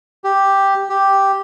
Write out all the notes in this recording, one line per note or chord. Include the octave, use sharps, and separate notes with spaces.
G4
G4